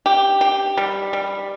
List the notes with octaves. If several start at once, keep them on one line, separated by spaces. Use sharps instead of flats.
G4
G4
G3
G3